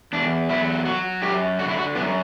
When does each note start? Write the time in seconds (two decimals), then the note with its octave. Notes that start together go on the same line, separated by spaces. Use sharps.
0.13 E2 D4
0.49 F#3 E4
0.86 F#3 F#4
1.22 F#2 G4
1.59 D3 F#4
1.69 E4
1.78 F#4
1.95 F#2 B3